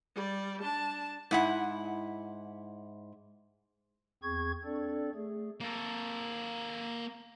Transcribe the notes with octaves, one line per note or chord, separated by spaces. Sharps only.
G3 D5
D4 A5
G#2 E4 F#5
E2 C4 G#4 C#6 G#6
C4 D4 A4 D5
A3 G#4
A#3 A4